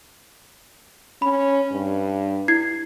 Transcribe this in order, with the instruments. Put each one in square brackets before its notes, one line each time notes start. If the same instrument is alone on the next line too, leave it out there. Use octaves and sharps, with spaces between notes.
[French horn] C#4 [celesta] B5
[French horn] G2
[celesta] E4 G#6 C7